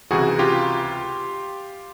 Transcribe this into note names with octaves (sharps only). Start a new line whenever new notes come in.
C#2 C3 E3 F#4 G#4
F4 G4